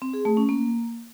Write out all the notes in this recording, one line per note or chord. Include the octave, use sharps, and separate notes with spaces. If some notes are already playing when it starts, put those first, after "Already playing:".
C4
G#4
A3
C#4
A#3